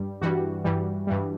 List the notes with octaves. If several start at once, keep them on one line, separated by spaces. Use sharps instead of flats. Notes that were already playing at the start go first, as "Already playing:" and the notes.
Already playing: G2 G3
G2 E3 G3 F#4
G2 E3 G3
G2 E3 G3